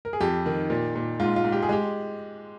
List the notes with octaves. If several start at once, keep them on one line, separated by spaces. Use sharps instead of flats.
A#4
G#4
F2 G4
D#3
A#2
A#2
G#2 F4
F4
G#2
G4
G#4
G#3 G4